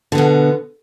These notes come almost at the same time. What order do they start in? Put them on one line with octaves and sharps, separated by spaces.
D3 B3 B2